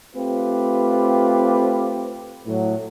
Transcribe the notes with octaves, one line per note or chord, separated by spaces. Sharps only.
A3 C4 F4 G4 B4
A2 F#3